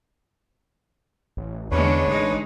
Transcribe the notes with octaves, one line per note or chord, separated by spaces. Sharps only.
A1
E2 D3 G#3 C#4 D4 B4 C#5
A1 G#3 D#4